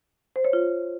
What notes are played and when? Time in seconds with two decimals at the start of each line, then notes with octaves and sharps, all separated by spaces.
0.36 C5
0.44 C#5
0.53 F4